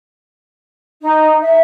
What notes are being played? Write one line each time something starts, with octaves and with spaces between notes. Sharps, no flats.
D#4
E5